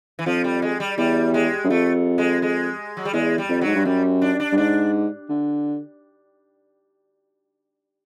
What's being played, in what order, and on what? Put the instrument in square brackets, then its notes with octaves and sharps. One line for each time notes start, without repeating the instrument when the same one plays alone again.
[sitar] E3
[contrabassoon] F2 [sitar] F3
[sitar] G3
G#3
G3
[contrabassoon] E2 [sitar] G3
[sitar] G#3
[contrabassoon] F#2
[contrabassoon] F2 [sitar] A3
[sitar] G#3
G#3
F#3
G3
[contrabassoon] E2 [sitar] G#3
[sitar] G3
[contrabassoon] F2
[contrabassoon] G#2 [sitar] F#3
[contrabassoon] G2
[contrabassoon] F#2 [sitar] G3
[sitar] D4
D4
[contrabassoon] G2
[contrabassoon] G#2 [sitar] D4
[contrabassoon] D3